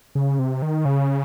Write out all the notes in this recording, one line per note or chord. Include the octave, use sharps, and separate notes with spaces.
C#3
C3
D#3
C#3